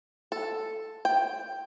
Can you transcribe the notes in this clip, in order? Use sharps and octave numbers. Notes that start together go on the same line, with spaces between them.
A4
G5